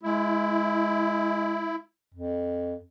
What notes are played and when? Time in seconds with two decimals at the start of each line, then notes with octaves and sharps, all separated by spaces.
0.03 G#3 E4
2.14 F2